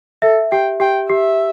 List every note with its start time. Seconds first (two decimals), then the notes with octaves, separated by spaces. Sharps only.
0.22 A4 E5
0.51 G4 G5
0.80 G4 G5
1.09 G4 E5